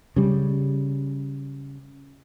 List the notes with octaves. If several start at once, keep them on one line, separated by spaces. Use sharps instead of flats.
C#3 G3